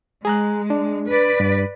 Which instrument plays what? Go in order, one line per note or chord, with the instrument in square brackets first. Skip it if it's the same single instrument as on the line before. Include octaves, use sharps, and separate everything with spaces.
[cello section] G#3 [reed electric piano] G#4 A#5 F#6
[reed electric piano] D4
[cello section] B4 D5
[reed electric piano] G2